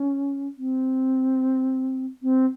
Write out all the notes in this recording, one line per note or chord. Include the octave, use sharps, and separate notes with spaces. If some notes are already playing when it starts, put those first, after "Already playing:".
Already playing: C#4
C4
C4